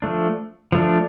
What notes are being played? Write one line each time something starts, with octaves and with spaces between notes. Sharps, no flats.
F3 A3 D4
F3 A3 D4